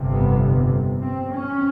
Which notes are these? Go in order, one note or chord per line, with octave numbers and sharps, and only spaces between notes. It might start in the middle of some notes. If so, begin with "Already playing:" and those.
Already playing: G1 F2 C3
B3
C4
C#4